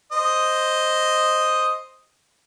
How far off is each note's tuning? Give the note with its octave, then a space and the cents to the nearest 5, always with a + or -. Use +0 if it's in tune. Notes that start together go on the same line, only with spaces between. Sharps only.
C5 +0 D#5 +0